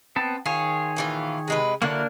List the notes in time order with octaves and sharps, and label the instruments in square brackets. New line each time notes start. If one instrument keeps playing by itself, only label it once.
[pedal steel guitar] B3 C4 A5
[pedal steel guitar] D#3 G#4 C#5 [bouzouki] F4
[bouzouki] A#2 E3 F4
C3 G#3 B4
[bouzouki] D3 F#3 E4 [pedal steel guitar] A#3 D4 A#4